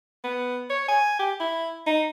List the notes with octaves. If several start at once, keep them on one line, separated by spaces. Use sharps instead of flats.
B3
C#5
G#5
G4
E4
D#4